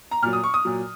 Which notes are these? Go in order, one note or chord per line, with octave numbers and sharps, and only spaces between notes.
A#5
A#2 F#3 F6
D#6
C#6
D#6
A#2 F#3